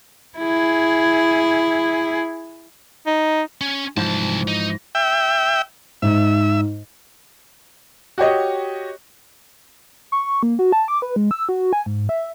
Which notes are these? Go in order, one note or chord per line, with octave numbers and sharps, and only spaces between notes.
E4 G#4
D#4
C#4
C2 G#2 E3 F3 A5
D#4
E5 G5
G#2 D#4 E5
F#4 G4 C#5 D#5
C#6
A#3
F#4
A5
D6
B4
G#3
E6
F#4
G#5
G#2
E5